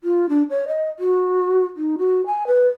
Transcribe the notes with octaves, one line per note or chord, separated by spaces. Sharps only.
F4
D4
C#5
D#5
F#4
D#4
F#4
G#5
B4